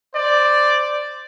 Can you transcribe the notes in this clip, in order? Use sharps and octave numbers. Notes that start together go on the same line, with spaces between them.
C5 D5